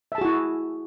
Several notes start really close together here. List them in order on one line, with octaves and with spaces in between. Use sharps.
E5 A5 G#4 F#4 E4